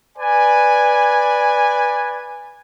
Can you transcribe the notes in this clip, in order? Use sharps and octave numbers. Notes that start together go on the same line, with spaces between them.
B4 D5 G#5